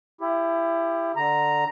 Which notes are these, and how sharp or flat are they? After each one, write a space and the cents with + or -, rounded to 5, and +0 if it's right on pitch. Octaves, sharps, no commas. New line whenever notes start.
E4 +25 G4 +25
D3 +10 A#5 +0